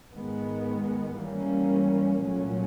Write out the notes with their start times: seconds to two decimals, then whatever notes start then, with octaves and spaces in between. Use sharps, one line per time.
0.13 G#2 D#3 G#3 B3
1.17 G#2 E3 G3 A#3 C#4
2.21 C2 A#2 F#3 A3 C#4